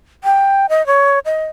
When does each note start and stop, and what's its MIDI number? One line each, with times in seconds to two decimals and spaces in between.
0.24 0.66 79
0.69 0.85 75
0.87 1.19 73
1.25 1.46 75